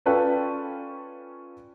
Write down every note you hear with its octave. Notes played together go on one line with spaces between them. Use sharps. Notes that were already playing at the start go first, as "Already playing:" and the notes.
C#4 F4 A4 B4 D5 G5